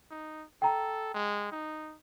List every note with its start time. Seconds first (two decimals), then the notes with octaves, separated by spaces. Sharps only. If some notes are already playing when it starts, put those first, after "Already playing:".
0.11 D#4
0.62 A4 G5 A#5
1.14 G#3
1.52 D#4